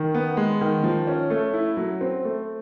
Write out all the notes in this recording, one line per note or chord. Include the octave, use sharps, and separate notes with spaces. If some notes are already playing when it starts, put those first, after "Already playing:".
Already playing: D#3
B3
G#3
D#3
F3
C#4
A3
E4
F#3
C4
A3